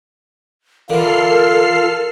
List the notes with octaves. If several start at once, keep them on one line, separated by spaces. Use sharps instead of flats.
D3 E3 F4 A4 A#4 F6 C7